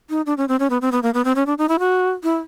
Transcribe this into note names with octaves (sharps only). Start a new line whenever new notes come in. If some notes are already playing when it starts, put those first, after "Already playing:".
D#4
D4
C#4
C4
C#4
B3
C4
B3
A#3
B3
C4
C#4
D4
D#4
E4
F#4
E4